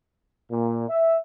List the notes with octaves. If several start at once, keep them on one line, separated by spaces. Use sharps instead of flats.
A#2
E5